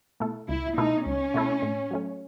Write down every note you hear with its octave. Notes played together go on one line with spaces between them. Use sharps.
B2 A3 E4 A4
C#2 E4
B2 A3 D#4 E4 A4
C#2 C#4
B2 A3 E4 A4
A2
F#3 A3 C#4